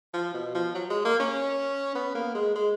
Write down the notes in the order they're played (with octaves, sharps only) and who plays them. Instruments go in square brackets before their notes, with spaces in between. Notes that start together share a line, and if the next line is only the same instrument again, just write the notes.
[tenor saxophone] F3
B2
F3
F#3
G#3
A#3
C#4
B3
A#3
G#3
G#3